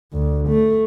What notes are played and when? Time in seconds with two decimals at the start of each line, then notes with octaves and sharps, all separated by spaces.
0.13 D2
0.48 A3